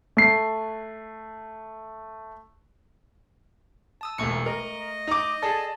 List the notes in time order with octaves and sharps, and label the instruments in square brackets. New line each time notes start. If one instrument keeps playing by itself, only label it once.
[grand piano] A3 C7
[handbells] A5 D#6 E6
[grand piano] E1 A#1 [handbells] A3 C#6 C#7
[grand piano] A#4 [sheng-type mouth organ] D#5
[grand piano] D#4 D6
[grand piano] G#4 A4 [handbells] D5 A5